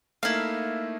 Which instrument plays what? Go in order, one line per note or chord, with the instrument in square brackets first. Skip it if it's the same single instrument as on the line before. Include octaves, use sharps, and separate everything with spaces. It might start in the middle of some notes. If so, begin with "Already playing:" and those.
[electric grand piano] A3 A#3 D#4 [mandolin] E4 F5